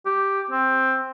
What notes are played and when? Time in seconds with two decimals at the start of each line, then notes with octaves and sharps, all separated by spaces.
0.06 G4
0.51 C4